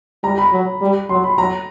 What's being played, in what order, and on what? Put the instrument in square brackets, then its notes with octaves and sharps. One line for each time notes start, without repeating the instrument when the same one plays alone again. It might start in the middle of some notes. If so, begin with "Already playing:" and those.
[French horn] G3 [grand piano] A#5
[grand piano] B5
[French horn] F#3
G3
[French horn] F#3 [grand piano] C6
[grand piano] B5
[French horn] F#3 [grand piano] A#5